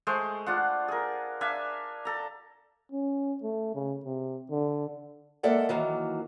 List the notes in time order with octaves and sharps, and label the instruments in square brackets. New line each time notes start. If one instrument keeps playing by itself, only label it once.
[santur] G#3 A3 C5
D4 F4 F#5
G#4 A#4
D4 E5 F5 G#5
A4 A#5
[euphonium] C#4
A3
C#3
C3
D3
[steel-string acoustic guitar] G#3 A#3 A4 D5 E5 F#5
D#3 E3 F#3 A#3